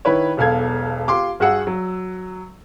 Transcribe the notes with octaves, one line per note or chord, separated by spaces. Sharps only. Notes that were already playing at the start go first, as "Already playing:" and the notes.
D#3 E4 B4 C#5
E1 B1 A4 F5 G#6
F4 G4 C6 D6
G2 F#4 G#4 F#5 E6
F#3